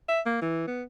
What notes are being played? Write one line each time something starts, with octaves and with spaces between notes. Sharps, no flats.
E5
A#3
E3
B3